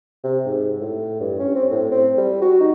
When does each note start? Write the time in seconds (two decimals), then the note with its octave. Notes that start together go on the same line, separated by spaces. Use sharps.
0.24 C3
0.46 G#2
0.81 A2
1.21 G2
1.39 C#4
1.55 C4
1.72 A2
1.91 C4
2.18 G3
2.42 F#4
2.60 D#4